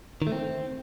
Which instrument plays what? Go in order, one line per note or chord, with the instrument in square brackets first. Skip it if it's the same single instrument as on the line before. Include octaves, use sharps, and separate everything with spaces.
[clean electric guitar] D#3
A3
C4